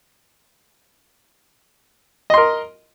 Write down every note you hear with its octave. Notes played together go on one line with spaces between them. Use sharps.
A#4 D#5 C6